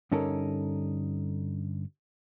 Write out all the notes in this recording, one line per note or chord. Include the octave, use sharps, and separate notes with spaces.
G2 D3 C#4 D#4 A4 A#4